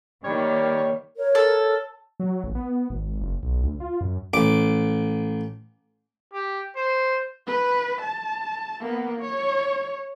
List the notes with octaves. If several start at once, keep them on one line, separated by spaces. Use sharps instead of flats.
D#3 G3 A#3 C#5
A#4 C#5
A4
F#3
A1
B3
G#1
F#1
B1
D2
F4
F#2
A1 D6
G4
C5
B4
A5
A#3 B3
C#5